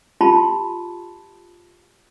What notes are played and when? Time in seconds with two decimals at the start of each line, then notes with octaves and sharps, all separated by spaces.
0.21 F4 G4 A5 B5 C6